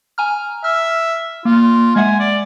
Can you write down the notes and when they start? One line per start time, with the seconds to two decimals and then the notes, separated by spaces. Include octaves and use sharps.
0.18 G#5 A#5 F6
0.64 E5 F6
1.45 A#3 F4
1.96 G#3 E5 F#5 G#5
2.20 D5